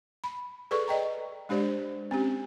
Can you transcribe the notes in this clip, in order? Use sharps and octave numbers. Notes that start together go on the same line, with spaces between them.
B5
G#4 A4 B4 D5 C#6
D5 D#5 G5 A#5
G#3 D4 G4 C5 D5
C4 C#4 G4